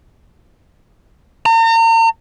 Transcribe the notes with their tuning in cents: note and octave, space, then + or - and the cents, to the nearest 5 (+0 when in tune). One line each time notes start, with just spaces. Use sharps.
A#5 -40